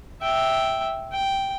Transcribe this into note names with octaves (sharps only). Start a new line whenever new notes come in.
E5 G5
G5